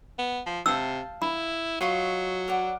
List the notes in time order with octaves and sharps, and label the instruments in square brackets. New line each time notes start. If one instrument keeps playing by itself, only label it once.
[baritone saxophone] B3
F3
[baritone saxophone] C3 [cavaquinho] F5 A5 [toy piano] E6
[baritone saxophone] E4 [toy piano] B5
[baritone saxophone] F#3 [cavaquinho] F4 D#5 C#6
[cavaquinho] A#4 D5 F#5